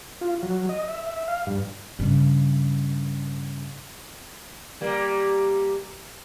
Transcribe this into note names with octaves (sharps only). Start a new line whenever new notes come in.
F4
F#3
D#5
E5
E5
F5
G2
G2 C#3
G3 A#3